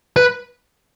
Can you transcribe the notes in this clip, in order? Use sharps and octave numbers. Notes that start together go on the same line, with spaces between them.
B4